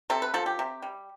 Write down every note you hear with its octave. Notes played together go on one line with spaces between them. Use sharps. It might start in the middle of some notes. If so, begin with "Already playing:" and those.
C3 A4
B4
F3 A4
G4
C3
G3